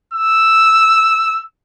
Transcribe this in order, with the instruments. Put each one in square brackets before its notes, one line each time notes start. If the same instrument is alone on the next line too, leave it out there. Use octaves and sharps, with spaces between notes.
[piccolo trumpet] E6